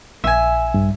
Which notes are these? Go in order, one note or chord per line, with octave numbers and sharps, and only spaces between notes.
A#1 E5 G#5
G2